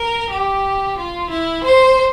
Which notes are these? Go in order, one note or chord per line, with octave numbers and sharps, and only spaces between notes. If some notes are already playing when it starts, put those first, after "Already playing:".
Already playing: A#4
G4
F4
E4
C5